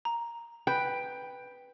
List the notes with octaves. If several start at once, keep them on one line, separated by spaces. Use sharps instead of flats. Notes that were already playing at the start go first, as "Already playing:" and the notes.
A#5
B4 G5